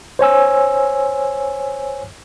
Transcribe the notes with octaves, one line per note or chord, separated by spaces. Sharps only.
C5 C#5 G#5 E6